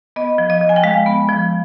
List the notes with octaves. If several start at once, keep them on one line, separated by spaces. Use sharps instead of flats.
B3 D#5
F3
D#5
F3
G#5
G5
G#3 F5
B3
F3